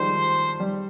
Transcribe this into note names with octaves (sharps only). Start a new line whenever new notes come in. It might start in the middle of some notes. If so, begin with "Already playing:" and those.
Already playing: D#3 F3 G3 G#3 C5
G3